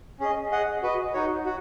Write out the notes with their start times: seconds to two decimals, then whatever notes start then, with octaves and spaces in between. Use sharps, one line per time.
0.20 C#4 G#4 D#5
0.51 G#4 D#5 F#5
0.82 F#4 B4 D#5
1.14 D#4 F#4 C#5
1.45 F#4